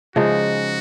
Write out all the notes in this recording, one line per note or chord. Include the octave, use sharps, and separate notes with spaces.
C#3 F3 G#3 D#4 F#4